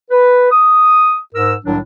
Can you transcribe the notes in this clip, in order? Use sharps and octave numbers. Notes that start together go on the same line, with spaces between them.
B4
D#6
G#2 A#4 E6
C2 A2 D#3 F#3 D4